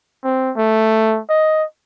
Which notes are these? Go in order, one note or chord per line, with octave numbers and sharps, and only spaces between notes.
C4
A3
D#5